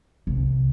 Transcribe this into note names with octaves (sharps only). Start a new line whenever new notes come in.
C2